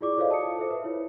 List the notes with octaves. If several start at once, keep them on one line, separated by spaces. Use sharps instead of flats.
E4 F4 G#4 D5 C#6 D6
F4 A4 C5 C#5 D#5 F5
F#4 A5 D#6 C#7
A4 C5 E5
B4
E4 F4 C#5